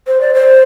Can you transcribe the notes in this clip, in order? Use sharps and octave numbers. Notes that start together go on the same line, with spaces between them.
C5
D5
C5